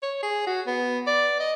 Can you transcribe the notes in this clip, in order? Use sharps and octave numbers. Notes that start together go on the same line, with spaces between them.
C#5
G#4
F#4
B3
D5
D#5